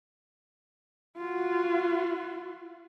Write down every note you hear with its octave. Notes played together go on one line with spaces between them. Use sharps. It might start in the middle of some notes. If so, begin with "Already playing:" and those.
F4 F#4